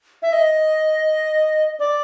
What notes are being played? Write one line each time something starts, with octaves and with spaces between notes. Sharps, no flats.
E5
D#5
D5